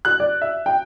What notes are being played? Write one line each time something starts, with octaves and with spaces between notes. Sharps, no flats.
F#6
D5
E5
G5